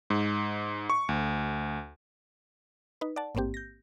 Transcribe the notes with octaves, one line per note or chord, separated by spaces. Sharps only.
G#2
C#6
D2
D#4 B4
D5 F#5 A5
A1 G#2 A#3 C4 G4
G6 A#6